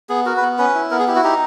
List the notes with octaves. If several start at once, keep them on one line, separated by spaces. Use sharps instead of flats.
B3 G#4
F#4 A#4
B4
B3
C#4 B4
E4
B3 A#4
G#4
E4 G4
F#4
D#4 G4